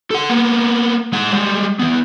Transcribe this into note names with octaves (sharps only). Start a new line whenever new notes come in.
A4 F#5
A#3 B3
G#3 F#5
G3 G#3
E2 B3